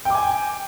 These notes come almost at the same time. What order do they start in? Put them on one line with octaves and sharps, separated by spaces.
G5 D6 G#5